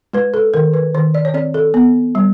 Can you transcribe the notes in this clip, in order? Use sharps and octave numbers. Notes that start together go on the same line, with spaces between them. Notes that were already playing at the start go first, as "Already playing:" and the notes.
G#3 B4
A4
D#3 A#4
B4
D#3 C5
D5
C#5
C4 D5
A4
B3
G3